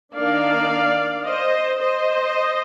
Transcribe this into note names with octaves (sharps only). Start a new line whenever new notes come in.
D#3 A#3 D4 D5 F5
C5 D#5
C5 D#5